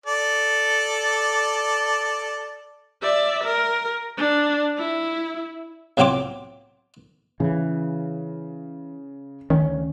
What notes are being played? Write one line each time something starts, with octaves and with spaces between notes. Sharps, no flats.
A4 D5
D5 E5
A#4
D4
E4
C2 A2 F#3 C4 F4 D6
C#3 E3
D2 D#3 C#4